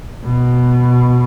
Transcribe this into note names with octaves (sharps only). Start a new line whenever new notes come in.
B2